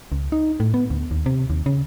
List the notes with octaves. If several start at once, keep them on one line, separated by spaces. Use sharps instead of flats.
C#2
D#4
A2
B3
D2
D#2
C3
D#2
C#3